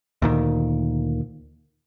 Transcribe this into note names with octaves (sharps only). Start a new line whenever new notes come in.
D2 A#2 D#3